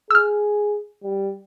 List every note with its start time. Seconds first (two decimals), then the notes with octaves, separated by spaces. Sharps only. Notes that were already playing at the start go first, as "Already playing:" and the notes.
0.11 G#4 E6 F6
1.04 G3